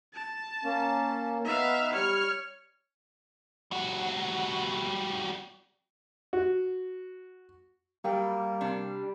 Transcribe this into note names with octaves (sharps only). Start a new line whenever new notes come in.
A5
A#3 C#4
B3 D#4 E5 F5
G3 C#5 F6
G3 F#4
F#4
F#3 G3 A#3 G5
C3 D4